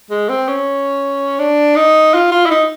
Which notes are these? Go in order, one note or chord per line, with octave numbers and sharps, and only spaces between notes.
G#3
C4
C#4
D4
D#4
F4
F4
E4
D#4